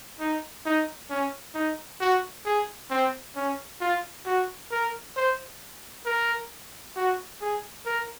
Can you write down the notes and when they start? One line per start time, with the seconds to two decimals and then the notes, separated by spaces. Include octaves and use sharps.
0.20 D#4
0.66 D#4
1.10 C#4
1.55 D#4
2.00 F#4
2.45 G#4
2.90 C4
3.36 C#4
3.81 F4
4.26 F#4
4.71 A#4
5.16 C5
6.06 A#4
6.96 F#4
7.41 G#4
7.86 A#4